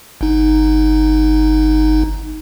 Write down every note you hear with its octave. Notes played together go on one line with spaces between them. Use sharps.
G1 D#4